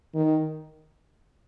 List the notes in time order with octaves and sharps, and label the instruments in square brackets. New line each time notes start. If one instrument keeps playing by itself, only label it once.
[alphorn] D#3